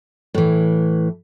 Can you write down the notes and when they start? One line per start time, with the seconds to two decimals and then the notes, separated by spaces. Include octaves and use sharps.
0.34 A2 E3